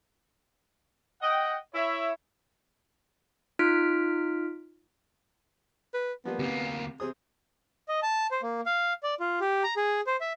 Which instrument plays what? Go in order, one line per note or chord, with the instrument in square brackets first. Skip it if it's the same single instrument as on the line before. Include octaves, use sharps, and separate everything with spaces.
[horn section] D#5 F#5 G5
E4 C#5 E5
[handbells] D#4 F4 F6 B6 D7
[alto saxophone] B4
[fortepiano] F3 G3 A#3 [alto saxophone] B3
[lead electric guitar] D2 A#3 [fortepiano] C3
[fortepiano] C3 C5 D#6 [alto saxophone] G#4
[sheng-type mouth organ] D#5
A5
C5
A#3
F5
D5
F4
G4
A#5
G#4
C5
E5